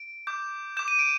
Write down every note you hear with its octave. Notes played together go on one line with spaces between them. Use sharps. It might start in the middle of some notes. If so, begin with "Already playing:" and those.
Already playing: D7
D6 G6
D6 G6 E7
D#7
D7